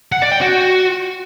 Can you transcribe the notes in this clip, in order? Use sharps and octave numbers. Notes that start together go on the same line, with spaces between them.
F#5
D5
G5
F#4